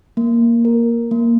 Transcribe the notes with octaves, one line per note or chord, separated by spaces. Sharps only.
A#3
A#4
A#3